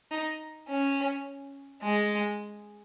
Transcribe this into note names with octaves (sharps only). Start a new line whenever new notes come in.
D#4
C#4
G#3